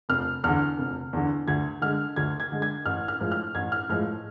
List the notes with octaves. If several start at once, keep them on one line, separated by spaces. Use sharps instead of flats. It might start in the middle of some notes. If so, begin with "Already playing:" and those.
F1 F6
E2 D3 F6
F1
E2 D3
D2 G#6
D3 G#3 F6
D2 G#6
G#6
D3 G#3
G#6
A1 F6
F6
A2 F3 G#3
F6
A1 G#6
F6
A2 F3 G#3 F6